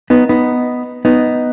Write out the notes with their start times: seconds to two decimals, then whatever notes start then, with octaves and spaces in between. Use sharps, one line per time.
0.10 B3 D#4
0.29 B3 D#4
1.05 B3 D#4